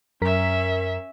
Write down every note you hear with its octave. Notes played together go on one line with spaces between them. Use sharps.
F#2 C#4 A#4 E5 B6